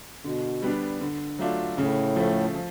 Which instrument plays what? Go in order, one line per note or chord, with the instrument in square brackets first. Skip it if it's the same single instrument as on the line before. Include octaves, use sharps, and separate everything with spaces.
[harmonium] B2 [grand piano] D3
[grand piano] G3 B3 D4
D3
F#3 A3 D4 F4
[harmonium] A2 [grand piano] C#3
[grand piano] F3 A3
F3